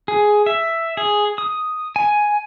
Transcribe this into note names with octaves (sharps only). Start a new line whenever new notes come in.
G#4
E5
G#4
D#6
G#5